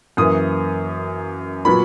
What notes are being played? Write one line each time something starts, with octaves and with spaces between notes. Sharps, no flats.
F#2 E3 A#3 D#6
A#2 F#3 B3 B5